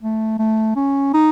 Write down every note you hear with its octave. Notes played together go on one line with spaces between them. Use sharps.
A3
A3
C#4
D#4